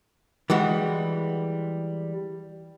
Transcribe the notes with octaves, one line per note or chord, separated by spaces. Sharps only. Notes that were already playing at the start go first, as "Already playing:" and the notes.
E3 G3 G#3 F#4